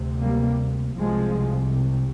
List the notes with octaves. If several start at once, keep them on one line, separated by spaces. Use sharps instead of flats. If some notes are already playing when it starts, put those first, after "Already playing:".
Already playing: D2 C3
G3 A#3
C2 C3 F3 G#3